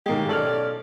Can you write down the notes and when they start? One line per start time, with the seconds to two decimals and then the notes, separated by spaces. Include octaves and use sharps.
0.06 A2 D#3 G#3 A#3 G4 G#4
0.29 B1 C#4 A4 D5 F6 F#7